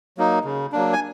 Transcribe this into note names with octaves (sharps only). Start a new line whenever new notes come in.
F#3 A#3 D#4
C#3
F#3 A#3 D4
G#5